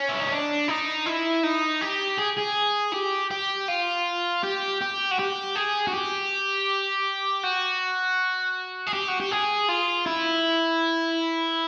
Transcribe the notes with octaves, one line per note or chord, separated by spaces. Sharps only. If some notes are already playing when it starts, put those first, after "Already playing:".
Already playing: C#4
E4
D#4
D4
D#4
E4
D#4
G4
G#4
G#4
G4
G4
F4
G4
G4
F#4
G4
G#4
F#4
G4
F#4
G#4
G4
F#4
G4
G#4
F4
E4